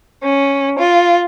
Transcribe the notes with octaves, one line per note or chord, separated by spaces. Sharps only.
C#4
F4